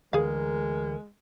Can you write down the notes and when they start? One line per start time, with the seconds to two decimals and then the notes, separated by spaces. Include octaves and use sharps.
0.13 D2 D3 E3 G#3 G#4 A#4 F5